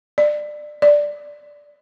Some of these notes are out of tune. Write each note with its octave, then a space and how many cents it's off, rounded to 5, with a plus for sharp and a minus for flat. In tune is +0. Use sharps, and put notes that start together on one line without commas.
D5 +20
D5 +0